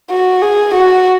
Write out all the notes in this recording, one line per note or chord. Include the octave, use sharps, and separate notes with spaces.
F#4
G#4
F#4